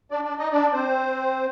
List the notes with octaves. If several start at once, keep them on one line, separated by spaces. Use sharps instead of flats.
D4 D5
D4 D5
D#4 D#5
D4 D5
C4 C5